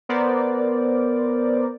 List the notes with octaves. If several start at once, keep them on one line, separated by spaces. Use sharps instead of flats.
B3 A#4 C5 D5